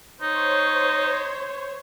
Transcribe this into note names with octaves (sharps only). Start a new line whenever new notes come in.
D#4 C5 C#5